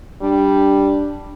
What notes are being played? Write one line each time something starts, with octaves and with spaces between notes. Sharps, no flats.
G3 D4